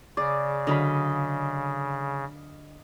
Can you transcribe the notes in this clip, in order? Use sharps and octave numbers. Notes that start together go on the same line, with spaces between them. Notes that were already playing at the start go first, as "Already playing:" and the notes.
C#3 G#4 D5
D3 F#3 D#5 F5 B5